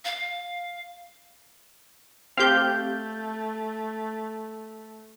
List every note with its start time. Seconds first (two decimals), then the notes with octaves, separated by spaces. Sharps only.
0.05 F5
2.37 A3 C4 G4 F5 G6